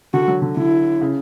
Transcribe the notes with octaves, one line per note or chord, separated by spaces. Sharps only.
D3 F#4
F#3
D3
D3 E4
C#3